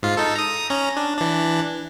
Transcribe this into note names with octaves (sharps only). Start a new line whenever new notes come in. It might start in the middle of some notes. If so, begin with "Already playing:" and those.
G#2 F4
D#4 A4
A#5 D#6
C#4 A#5
D4
E3 D4